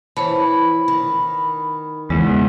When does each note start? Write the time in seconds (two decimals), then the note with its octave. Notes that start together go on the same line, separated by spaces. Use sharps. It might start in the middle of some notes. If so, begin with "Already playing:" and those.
0.17 E3 C5 C#5 A5 B5
0.88 D#3
2.10 E2 C#3 G#3